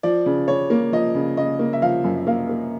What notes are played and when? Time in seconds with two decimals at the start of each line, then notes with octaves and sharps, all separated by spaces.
0.03 F3 D5
0.26 C#3
0.48 C#3 C#5
0.70 A#3
0.92 F3 D#5
1.15 C#3
1.37 C#3 D#5
1.59 A#3
1.73 E5
1.82 F3 F5
2.04 F#2
2.27 A#3 F5
2.49 A#3